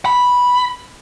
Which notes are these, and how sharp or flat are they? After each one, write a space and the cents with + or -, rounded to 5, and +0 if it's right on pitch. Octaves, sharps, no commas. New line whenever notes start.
B5 -5